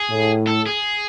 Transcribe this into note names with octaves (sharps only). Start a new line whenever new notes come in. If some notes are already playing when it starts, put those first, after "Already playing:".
Already playing: G#4
A2
A4
G#4